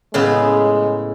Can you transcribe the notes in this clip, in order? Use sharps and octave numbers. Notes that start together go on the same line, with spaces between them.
A2 C#3 G#3 B3